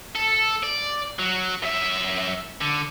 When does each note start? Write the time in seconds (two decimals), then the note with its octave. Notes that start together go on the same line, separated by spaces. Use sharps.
0.16 A4
0.63 D5
1.19 F#3
1.63 F#2 E5
2.61 D3